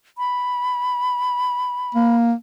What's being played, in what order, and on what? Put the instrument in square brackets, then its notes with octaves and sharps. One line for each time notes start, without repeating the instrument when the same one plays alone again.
[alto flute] B5
[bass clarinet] A#3